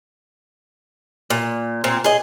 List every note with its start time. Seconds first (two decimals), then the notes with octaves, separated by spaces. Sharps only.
1.30 A#2
1.84 A#2 C4
2.04 G#4 D#5